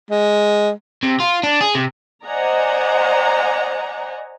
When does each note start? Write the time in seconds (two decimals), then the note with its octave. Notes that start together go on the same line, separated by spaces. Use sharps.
0.11 G#3
1.03 C3
1.20 F4
1.43 D4
1.61 G#4
1.75 C3
2.25 C5 D5 D#5 F#5 G#5 A#5